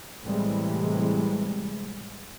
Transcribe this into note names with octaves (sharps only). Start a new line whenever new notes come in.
A2 C3 E3 G3 G#3